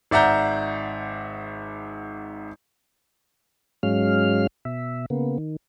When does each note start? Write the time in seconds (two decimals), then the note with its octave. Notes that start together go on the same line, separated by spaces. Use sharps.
0.11 G#1 D5 E5 F#5 A#5 G6
3.83 G#2 F#3 G#3 C#4 F5 F6
4.65 B2 E5
5.10 C#3 A#3 B3
5.38 D#3